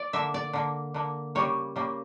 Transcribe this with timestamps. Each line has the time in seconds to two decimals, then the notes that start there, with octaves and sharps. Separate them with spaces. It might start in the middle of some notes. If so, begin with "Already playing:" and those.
Already playing: D5
0.13 D3 A#3 E5
0.34 D5
0.53 D3 A#3
0.94 D3 A#3
1.35 C#3 G3 A#3 C#5
1.76 C#3 G3 A#3